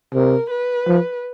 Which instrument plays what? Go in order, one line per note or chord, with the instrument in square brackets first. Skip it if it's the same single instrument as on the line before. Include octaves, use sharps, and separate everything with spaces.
[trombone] C3 [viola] A#4
[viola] B4
[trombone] F3